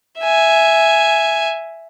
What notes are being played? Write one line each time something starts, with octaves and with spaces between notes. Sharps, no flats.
E5 G#5